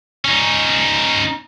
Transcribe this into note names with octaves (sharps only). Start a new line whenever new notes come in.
C#4 D#4